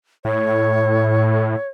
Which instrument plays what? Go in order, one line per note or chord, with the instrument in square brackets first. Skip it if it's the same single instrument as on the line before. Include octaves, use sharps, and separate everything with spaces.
[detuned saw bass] A2 [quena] C#5